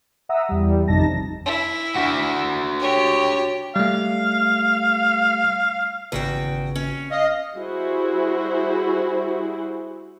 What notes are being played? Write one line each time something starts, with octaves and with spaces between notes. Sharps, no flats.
E5 F#5 A#5 D#6 E6
E2 G3
G#1 F2 C3 D#4 A5 A#6
E4
D4 F#4 F#5
G4 C#5
G3 A3 F5
G#1 E2 C#3 F#4 B4 G5
C#4
D#5 F5
G3 E4 F#4 G#4 C5